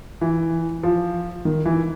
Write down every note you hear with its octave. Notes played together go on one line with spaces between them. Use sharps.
E3
F3
D#3
E3